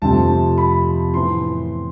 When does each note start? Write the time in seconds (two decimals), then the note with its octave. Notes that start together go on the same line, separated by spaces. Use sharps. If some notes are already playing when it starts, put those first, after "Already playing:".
0.02 F2 C3 F3 A3 C4 A5
0.58 B5
1.14 A2 E3 B3 C6